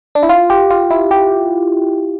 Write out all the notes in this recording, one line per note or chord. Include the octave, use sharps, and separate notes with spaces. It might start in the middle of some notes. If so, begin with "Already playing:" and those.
D4
E4
F4
G4
F4
E4
G4